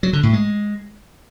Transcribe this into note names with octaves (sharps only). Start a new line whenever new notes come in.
F#3
D3
A2
G#3